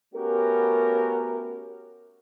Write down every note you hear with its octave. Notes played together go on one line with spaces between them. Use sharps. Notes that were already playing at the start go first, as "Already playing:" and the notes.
A3 B3 C#4 F#4 G4 A#4